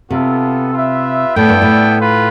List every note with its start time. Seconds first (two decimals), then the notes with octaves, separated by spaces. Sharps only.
0.10 C3 B3 F4 A4
0.73 F4 B4 E5
1.36 A2 B3 E4 A4 D5 G5
1.49 G2
1.62 A2
1.99 F4 B4